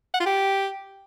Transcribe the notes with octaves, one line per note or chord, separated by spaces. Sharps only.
F#5
F4
G4